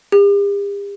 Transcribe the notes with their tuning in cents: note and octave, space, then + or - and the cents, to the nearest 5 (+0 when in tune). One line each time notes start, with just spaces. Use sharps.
G4 +45